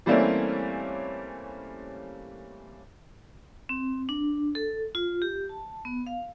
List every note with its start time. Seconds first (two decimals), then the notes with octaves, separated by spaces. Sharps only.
0.06 E3 G3 A3 A#3 C4 C#4
3.69 C4
4.09 D4
4.55 A4
4.95 F4
5.22 G4
5.49 A5
5.85 B3
6.07 F5